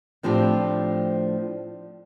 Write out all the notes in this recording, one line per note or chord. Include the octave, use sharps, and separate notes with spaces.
A2 F3 C4 D4 G4